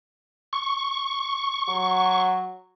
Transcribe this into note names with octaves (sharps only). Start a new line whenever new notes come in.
C#6
F#3